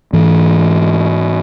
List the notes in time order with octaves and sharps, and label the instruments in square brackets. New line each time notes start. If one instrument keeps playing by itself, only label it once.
[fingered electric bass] G#2 E3